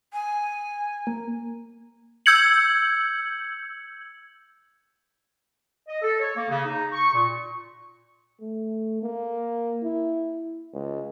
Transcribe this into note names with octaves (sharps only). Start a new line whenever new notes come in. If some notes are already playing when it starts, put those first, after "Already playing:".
G#5
A#3
E6 G6 G#6 C#7 F#7
D#5
A4
C#5
A#3
C#3
D#4
C#6
A#2
A3
A#3
E4
C#2